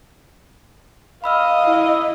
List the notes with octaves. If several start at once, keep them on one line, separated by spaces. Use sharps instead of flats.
D#5 F5 B5 E6 F6
E4